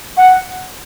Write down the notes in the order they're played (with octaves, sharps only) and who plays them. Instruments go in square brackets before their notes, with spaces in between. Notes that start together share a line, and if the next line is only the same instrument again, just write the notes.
[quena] F#5